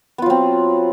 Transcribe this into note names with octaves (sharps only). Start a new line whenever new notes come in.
F#3 B3 C4 F4